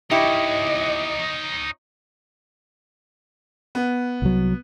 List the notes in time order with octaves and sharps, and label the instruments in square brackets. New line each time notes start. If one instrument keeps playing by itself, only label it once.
[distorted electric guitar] D#4 C#5 [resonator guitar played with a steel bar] E4 G4 [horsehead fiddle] D#5
[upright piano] B3
[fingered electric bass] C2 F#3